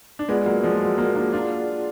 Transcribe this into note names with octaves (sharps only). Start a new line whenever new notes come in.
D4
G#3 B3 F4 G#4 D5 F#5
F#3 A#3
F3 G#3
F#3
F#3 A#3
A#3 D4
D4 F4